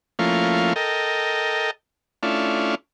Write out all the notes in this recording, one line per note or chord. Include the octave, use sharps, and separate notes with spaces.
F3 A3 A#3 C#4 E4 F4
A4 A#4 D#5 G5
A3 C#4 D4 E4 F4